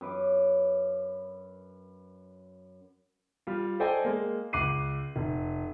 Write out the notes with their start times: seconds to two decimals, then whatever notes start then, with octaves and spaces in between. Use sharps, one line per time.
0.01 F#2 B4 D6
3.47 G3 F4
3.80 A4 C5 D5 D#5 G5 G#5
4.05 G#3 A#3
4.53 C#2 D6 F#6 C7 D#7
5.16 F1